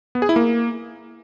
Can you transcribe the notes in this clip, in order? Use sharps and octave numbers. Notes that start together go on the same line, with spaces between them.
B3
G#4
E4
A#3